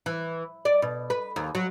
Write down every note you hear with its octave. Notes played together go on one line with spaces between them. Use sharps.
E3
D5
B2
B4
D#2
F#3